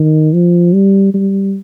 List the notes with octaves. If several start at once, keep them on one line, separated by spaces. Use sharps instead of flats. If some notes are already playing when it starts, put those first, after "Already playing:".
Already playing: D#3
F3
G3
G3